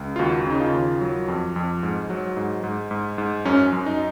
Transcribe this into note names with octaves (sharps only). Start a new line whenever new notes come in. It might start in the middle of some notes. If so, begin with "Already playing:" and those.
Already playing: C#2
F4
D#2 F#4
C#3 D#4
F4
D#2
F#3
F2
F2
G#2
F#3
G#2
G#2
G#2
G#2
F#2 C#4
F#2
D#4